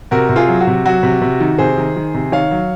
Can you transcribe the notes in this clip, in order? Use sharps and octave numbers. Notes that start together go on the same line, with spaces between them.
C3 F#4 A#4
C3
F4 G#4
F#3
F#4
C3
F#3 F#4
C3
C3
D#3
C3 G#4 C5
D#3
D#3
C3
D#3 C#5 F5
F#3